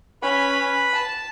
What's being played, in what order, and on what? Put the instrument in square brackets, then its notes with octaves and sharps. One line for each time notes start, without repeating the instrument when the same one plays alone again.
[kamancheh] C#4 [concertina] B4 B5
[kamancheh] A5